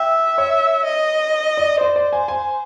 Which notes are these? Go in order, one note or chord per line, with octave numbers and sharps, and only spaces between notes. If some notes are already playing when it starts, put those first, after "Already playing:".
Already playing: E5 G5
C#5
D#5
D5
C5 D5
D5
G#5
G#5